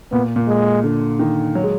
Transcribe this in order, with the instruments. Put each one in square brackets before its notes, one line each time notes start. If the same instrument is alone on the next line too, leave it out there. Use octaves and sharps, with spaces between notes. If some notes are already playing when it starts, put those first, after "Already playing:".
[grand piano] A#2 [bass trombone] B3
[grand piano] A#2
[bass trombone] G#3
[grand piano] D3
D#3
F#3
G#3